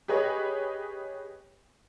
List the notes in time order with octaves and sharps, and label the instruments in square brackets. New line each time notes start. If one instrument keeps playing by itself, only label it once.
[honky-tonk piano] G4 G#4 B4 C#5 D#5